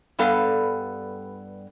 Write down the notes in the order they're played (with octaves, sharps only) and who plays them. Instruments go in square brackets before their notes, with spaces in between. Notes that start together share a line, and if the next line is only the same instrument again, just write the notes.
[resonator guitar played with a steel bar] G2 G3 B3 A4 F5